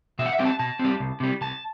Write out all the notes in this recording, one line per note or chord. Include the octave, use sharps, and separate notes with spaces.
B2 E5
F#5
E5
G3 C4 G5
A5
B2 A5
C4
G3
C2
C3 G3
C2 A5